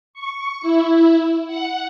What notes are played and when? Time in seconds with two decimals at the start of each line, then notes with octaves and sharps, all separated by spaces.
0.14 C#6
0.61 E4
1.46 F#5